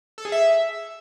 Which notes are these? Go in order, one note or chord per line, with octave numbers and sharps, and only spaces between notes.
A4
G#4
E5